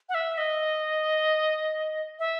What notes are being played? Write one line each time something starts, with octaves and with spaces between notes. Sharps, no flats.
F#5
E5
D#5
E5